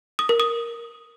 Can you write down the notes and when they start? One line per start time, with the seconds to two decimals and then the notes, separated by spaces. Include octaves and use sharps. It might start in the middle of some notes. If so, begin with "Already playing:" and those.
0.19 D#6
0.29 A#4
0.40 D#6